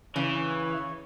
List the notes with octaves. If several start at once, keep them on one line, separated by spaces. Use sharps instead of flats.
C#3 E3 C#5